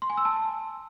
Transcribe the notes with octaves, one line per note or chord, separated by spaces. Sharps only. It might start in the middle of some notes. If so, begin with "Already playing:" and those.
C6
G#5
E6
A5